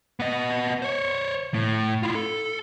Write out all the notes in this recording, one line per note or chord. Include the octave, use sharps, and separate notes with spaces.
B3 D#5
C5 C#5
A2
E4 F4
A4